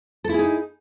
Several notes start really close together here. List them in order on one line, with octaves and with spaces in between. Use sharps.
A4 E4 G#4 D#4